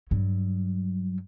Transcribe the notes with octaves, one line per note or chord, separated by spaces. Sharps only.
G2 F#3